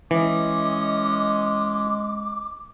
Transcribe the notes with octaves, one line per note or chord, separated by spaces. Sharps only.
E3 G#3 C#4 D#5 D6